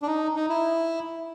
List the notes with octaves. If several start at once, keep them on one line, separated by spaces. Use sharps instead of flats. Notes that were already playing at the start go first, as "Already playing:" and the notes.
D4
D#4
D#4
E4